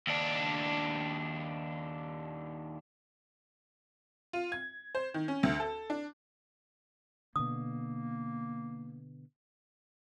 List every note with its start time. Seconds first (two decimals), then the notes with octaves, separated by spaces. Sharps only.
0.07 D#2 D4
4.33 F4
4.52 G#6
4.95 C5
5.14 D#3
5.28 C#4
5.43 D2
5.60 A4
5.90 D4
7.36 B2 D3 A#3 D#6